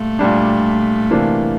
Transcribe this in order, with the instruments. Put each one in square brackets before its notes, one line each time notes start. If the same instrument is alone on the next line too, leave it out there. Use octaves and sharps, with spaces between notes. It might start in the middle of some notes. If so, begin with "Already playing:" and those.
Already playing: [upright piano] A#2 G3 [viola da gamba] A3
[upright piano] A#2 G3 D4
C3 E3 A#3 D4